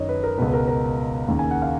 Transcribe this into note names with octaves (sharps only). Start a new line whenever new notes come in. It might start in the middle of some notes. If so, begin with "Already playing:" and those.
Already playing: F#2 D#3 C#5 D#5
B4
A#4
C#2 B2 B4
B4
A#4
A#4
D#2 C#3
G#5
F#5
F5